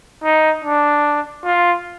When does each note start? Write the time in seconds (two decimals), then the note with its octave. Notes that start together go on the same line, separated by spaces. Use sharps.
0.23 D#4
0.65 D4
1.44 F4